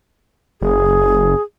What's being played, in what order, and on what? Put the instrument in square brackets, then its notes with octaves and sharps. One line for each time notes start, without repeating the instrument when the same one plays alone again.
[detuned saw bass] F#1 [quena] G#4